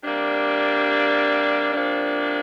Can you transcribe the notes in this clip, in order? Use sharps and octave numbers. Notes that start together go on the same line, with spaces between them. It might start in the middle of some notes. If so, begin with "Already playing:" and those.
C3 G3 A#3 D4
C3 F3 A#3 D4